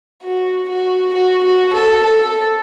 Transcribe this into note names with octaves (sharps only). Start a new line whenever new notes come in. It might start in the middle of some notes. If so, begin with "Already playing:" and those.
F#4
F#4
F#4
F#4
A4
A4